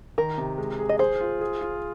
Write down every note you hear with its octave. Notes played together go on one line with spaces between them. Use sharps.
D#3 A#4
C3
G#3
G#4
D#5
G#4 C5
F4
G#4
F4